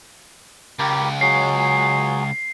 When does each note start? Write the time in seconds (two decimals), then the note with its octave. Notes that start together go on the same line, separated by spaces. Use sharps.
0.79 C#2 G4 A#4 B5
1.21 F#3 G#4 C#5 C7